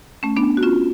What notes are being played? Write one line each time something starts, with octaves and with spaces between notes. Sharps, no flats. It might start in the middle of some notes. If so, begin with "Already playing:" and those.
A3 C#4
B3 D4
F#4
C#4 F4